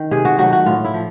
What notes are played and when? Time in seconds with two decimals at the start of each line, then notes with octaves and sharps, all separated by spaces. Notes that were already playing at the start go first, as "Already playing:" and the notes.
Already playing: D#3
0.11 C3 G#4
0.25 F#4
0.38 D#3 F#3 A3 F#4
0.53 F#4
0.66 A2 F4
0.85 E4
0.94 F3